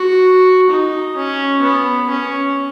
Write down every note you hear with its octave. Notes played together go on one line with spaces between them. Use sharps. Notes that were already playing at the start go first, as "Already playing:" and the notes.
Already playing: F#4
D#4
C#4
B3
C#4